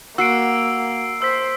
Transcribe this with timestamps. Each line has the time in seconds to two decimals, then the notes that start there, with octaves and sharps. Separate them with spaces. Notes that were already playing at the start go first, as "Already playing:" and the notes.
0.18 A#3 F#4 E6 C7 D7
1.22 C5 E6 B6